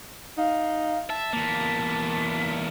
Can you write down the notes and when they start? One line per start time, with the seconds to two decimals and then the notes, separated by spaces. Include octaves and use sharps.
0.37 D#4 F5
1.10 E5 A5
1.33 E2 A#3 B6